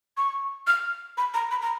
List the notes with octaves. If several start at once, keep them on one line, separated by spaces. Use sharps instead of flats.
C#6
F6
B5
A#5
B5
A#5